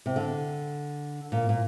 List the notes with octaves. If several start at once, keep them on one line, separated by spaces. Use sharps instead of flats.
C3
D3
A#2
A#2